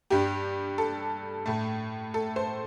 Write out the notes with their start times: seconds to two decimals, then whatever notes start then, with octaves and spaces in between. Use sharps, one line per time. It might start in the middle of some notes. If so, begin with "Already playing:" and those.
0.10 G2 G3 G4
0.78 A4
1.46 A2 A3
2.14 A4
2.36 C5